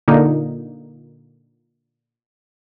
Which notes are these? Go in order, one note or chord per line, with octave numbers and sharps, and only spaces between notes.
A#2 D3 A#3 D#4